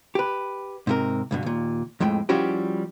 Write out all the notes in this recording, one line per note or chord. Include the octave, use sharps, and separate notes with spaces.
G4 B4
G#2 C3 A#4
C#2 G2 B2
D#2 A#2
F2 A2 G#3 G5
F3 G3 C#4 E4 F#4 G4